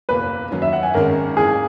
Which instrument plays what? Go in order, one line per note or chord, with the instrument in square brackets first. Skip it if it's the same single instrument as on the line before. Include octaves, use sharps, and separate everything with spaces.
[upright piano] F#1 E2 B2 A#3 [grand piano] B4
[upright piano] F#2 D#3 F#3 C#4
[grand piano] E5
F#5
G#5
[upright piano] G#1 F#2 D#3 G#3 C#4 [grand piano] A#4
[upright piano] G#2 E3 A#3 [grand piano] G#4